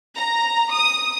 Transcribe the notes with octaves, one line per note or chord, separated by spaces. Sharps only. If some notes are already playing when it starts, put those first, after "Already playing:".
A#5
D#6